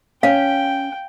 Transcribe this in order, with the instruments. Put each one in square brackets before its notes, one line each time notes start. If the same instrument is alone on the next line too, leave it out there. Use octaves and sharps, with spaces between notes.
[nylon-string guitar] C#4 [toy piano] F5 [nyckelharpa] G5